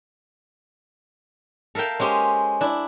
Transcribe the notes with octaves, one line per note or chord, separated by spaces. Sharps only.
A4 A#4 E5 F5 G5
G#3 C#4 G4 C5
D4 E4